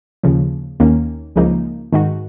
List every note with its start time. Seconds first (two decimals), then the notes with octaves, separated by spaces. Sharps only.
0.23 D#2 C#3 F3
0.80 D#2 D#3 A#3 C#4
1.36 C#2 C#3 F3 A#3 D#4
1.93 G#2 D#3 G#3 D#4 F#4